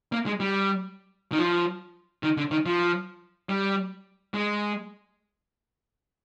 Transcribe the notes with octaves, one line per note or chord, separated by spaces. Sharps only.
A#3
G#3
G3
D#3
F3
D#3
D3
D#3
F3
G3
G#3